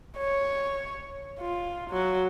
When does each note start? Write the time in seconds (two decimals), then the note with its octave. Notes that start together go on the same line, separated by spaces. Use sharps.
0.18 C#5
1.39 F4
1.90 F#3